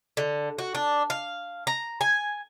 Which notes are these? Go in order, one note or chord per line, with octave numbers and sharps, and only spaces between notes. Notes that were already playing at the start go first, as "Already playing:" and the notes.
D3
F#4
D4
F5
A#5
G#5